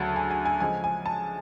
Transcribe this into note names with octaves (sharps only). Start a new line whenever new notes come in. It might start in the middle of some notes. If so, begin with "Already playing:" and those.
Already playing: D2 C#3 F#3 A5
G#5
G#5
G#5
C#3 F3 G#3 G#5
G#5
A5